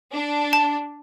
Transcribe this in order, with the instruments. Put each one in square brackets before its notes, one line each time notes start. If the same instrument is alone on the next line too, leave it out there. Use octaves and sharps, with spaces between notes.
[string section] D4
[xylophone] A5